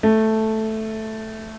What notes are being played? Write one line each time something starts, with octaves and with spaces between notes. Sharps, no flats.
A3